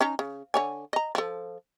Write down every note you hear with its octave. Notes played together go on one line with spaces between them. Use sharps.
C#4 D#4 A#5
C#3
D3 C#5 G#5
D#5 A#5
F3 A4